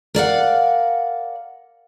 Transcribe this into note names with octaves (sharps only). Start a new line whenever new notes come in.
A#4 D5 F5 F#5